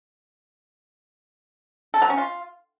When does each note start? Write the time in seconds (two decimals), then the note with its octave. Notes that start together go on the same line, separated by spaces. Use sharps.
1.94 A4
2.02 F#3
2.10 C#4
2.18 F4